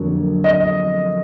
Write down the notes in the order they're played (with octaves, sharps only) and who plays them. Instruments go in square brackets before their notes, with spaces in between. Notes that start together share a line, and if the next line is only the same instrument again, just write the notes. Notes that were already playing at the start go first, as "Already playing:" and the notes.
Already playing: [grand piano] F2 D3 F#3 A#3
D#5